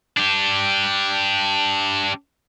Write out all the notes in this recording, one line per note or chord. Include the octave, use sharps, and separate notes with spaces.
D4 G4